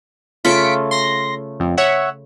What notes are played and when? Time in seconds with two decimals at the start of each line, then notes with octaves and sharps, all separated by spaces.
0.45 C#3 A3 F4 B6 C#7 D7
0.91 C6 A#6
1.60 F2
1.77 C#5 E5 F#5